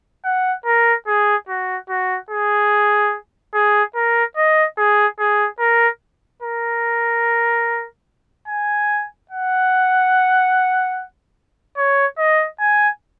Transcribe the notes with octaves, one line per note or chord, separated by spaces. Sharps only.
F#5
A#4
G#4
F#4
F#4
G#4
G#4
A#4
D#5
G#4
G#4
A#4
A#4
G#5
F#5
C#5
D#5
G#5